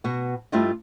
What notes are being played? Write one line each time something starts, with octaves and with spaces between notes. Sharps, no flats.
B2 F#4
G2 A3 E4 F4 G4 D#5